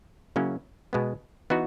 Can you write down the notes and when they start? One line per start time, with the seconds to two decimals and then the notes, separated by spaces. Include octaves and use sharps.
0.36 C#3 F#3 A#3 C#4 E4
0.93 B2 G#3 B3
1.50 E3 B3 D#4 F#4